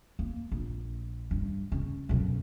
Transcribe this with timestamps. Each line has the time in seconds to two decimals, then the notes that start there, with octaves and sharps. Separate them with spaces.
0.19 A#3
0.52 A#1
1.31 G2
1.72 C#3
2.09 B1 F#2